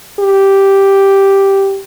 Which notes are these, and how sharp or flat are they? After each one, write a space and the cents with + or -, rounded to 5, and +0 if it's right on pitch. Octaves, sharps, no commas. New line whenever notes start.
G4 +0